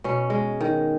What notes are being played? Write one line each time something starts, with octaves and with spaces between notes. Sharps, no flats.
B2 C#4
G#3
D#3